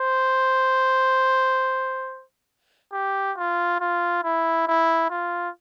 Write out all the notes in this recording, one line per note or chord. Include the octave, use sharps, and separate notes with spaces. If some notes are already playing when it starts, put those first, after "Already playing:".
Already playing: C5
G4
F4
F4
E4
E4
F4